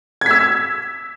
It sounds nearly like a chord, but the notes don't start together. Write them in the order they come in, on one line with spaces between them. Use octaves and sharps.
G#6 B6 E6